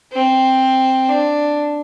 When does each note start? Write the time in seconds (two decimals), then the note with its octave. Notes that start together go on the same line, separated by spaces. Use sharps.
0.13 C4
1.08 D4